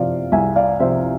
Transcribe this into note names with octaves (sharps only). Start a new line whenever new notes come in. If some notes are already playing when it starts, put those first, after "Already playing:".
Already playing: C3 F3 D5 F5
C2 E5 G#5
D5 F5
C3 F3 C5 E5